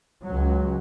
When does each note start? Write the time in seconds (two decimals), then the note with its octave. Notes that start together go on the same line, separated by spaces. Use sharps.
0.25 C#2 F#3